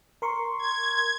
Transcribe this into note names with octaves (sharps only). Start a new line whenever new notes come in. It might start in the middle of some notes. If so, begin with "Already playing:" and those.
A#4 C6 C#6
G#6